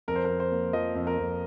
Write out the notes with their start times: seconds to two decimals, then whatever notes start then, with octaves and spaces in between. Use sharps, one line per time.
0.08 F2 A#4
0.16 C5
0.25 F2 A#4
0.40 C5
0.52 A#3
0.73 F3 D#5
0.95 F2
1.07 A#4
1.18 F2